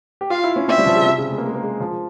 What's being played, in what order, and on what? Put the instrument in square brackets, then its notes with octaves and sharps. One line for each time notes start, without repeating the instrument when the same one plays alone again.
[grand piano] G4
[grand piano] F4 [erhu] F5
[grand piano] E4
C#4
[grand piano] C4 [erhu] E5
[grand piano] G3
F3
C#3
C3
C#3
G#3
A#3
G#3
A#3
G#3
F3